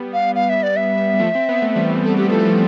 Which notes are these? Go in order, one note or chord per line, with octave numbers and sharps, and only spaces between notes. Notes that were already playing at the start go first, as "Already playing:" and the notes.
Already playing: G3 B3
F5
F5
E5
D5
E5
G3
F3 A3
C4
B3
A3
E3 G3
A3 A4
B3 G4
F3 A3 A4
F3 A3